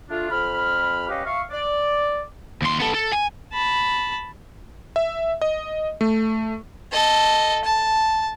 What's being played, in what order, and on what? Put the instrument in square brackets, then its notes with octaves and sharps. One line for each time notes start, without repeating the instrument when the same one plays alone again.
[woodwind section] A3 D4 F4
F2 B5 F6
G3 C#4 G4 B4 D#5 F5
E5 F5 C#6
D5
[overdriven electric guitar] D#2 C6
B3 A4
A4
G#5
[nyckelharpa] A5 B5
[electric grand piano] E5
D#5
A3
[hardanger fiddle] A4 D#5
A5